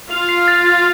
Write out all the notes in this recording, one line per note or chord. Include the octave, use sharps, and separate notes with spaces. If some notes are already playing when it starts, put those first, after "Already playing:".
F4 F5 F7
C7
A6
A6